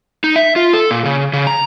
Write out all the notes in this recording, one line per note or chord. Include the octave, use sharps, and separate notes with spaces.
D#4
E5
F4
A4
A#2
C#3
C#3
A#5